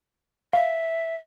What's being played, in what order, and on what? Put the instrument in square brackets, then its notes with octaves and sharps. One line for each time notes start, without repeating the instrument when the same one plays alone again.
[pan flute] E5 [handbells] F5